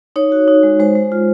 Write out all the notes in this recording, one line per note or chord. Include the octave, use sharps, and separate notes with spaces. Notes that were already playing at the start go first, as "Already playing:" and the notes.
D#4 C#5
F#4
D#4
G#3
G#3 C5
G#3
F4